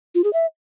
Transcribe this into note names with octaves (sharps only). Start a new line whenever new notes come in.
F4
G#4
E5